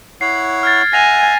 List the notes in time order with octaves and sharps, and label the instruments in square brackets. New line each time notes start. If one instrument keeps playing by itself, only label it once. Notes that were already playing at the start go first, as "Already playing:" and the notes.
[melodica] E4 C#5 F#5 [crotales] C7
[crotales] F6 G#6 A6
[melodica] E5 F#5 [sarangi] G#5 [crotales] A#6 F7